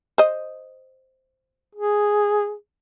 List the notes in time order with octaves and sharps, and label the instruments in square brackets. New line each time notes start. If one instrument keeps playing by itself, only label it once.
[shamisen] C5 D#5
[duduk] G#4